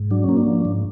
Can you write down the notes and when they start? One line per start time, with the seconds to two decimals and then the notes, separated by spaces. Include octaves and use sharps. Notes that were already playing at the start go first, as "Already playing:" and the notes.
Already playing: G#2
0.11 F#3 D4
0.24 A#3 C#4
0.37 D4
0.47 F3
0.65 G#2